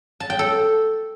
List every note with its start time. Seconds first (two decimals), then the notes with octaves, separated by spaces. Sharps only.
0.20 A5
0.30 G5
0.39 A4